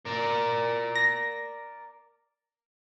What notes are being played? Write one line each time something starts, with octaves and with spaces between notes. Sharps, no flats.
A#4 D5
A#6